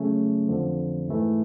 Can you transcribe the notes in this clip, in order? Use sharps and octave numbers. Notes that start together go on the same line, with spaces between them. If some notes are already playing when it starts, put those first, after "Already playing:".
Already playing: C#3 F#3 A3 C#4
F2 D3 F3
G#2 E3 A3